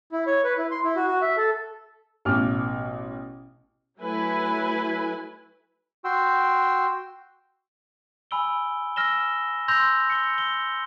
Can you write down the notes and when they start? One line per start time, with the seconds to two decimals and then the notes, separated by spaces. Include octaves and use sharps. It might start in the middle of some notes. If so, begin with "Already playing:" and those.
0.12 E4
0.27 C#5
0.44 B4
0.58 E4
0.71 C6
0.84 E4
0.96 F#4
1.08 F#4
1.21 E5
1.37 A4
2.25 A1 B2 D6 F6
4.00 F#3 A3 E4 B4 G#5
6.05 F#4 G5 C6 E6
8.31 G#5 B5 E6 D7 G7
8.96 G#5 E6 F6 A#6 E7 G7
9.68 C6 E6 G6 A#6 F7
10.10 C#7 G7
10.38 G7